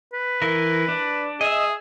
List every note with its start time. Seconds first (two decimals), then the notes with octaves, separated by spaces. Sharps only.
0.13 B4
0.42 E3 A#4
0.88 D4
1.41 G#4 D#5 E5